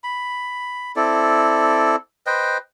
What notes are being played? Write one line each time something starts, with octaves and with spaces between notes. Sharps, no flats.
B5
C4 E4 A4 D5
B4 C5 D#5 G5